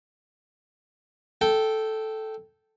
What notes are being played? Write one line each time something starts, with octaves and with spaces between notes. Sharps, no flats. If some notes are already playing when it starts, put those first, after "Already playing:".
A4 G5